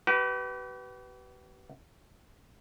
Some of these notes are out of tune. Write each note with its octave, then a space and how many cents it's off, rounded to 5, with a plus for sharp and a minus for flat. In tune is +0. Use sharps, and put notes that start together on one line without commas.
G4 -45 B4 +0